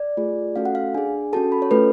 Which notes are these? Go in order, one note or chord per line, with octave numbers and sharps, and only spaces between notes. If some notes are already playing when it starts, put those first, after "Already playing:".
Already playing: D5
A3 F4 G#4
A3 C#4 F#4 A4 F5
F#5
F5
D4 G#4 G#5
C#4 F#4 A4 A5
B5
C#5
A3 C#4 F4 A4 B4